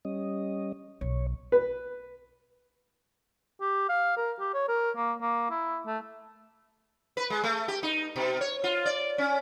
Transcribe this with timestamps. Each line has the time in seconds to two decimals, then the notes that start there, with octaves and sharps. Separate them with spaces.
0.05 G3 C#4 D#5
1.01 B1 C#5
1.52 B4
3.61 G4
3.89 F5
4.17 A#4
4.39 G4
4.54 C#5
4.68 A#4
4.96 A#3
5.21 A#3
5.50 E4
5.87 A3
7.17 B4
7.30 G#3
7.44 A3
7.68 G4
7.83 D#4
8.16 B2
8.41 C#5
8.64 F4
8.86 D5
9.18 C#4